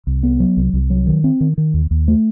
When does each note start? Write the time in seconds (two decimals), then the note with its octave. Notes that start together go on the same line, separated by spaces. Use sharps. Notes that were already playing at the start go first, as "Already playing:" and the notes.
0.07 C2
0.23 B3
0.40 F#3
0.57 C2
0.73 C2
0.90 F#3
1.07 D#3
1.24 C4
1.41 D#3
1.58 D#3
1.74 D#2
1.91 D#2
2.08 A3